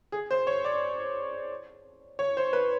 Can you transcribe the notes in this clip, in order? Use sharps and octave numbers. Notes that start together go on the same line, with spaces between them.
G#4
C5
C#5
D5
C#5
C5
B4